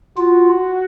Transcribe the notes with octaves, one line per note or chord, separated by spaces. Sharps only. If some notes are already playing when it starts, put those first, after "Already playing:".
F4 F#4